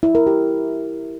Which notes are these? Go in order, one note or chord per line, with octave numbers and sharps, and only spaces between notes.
E4
A#4
G4